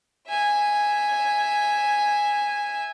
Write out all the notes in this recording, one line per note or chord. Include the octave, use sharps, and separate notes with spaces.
E5 G#5